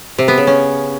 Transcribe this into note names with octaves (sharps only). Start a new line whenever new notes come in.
C3
B3
C#3
C#4